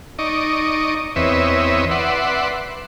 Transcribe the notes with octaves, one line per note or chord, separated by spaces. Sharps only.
D#4 D5 D#5 C#6
E2 C4 B4 C#5 D#5 E5
B4 D5 E5 F#5 C6